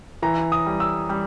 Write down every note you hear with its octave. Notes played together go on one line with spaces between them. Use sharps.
E3 A#5
D#6
G3
E6
G3